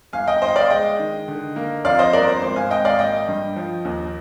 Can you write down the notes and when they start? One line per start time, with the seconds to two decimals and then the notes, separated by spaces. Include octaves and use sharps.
0.13 G1 F5 G#5
0.27 D#5 G5
0.41 G1 C5 D#5
0.49 G5
0.56 D5 F5
0.70 G#3 D#5 G5
0.99 D#3
1.28 D3
1.56 A#3
1.85 F2 D5 F5
1.99 C5 D#5
2.13 G1 A#4 D5
2.27 C5
2.42 G#1 C5
2.56 F5 G#5
2.70 G#1 D#5 G5
2.85 D5 F5
2.99 A#3 D#5 G5
3.28 G2
3.56 F3
3.85 D#2